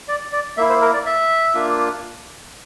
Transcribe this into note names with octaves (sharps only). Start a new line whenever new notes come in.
D5
D5
A#3 E4 E5
C5
A#4
D5
E5
A#3 D4 F4